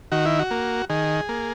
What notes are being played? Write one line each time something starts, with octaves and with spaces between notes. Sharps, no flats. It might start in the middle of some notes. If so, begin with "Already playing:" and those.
D#3 F#4
E4
F#4
A#3
D#3 G#4
A#3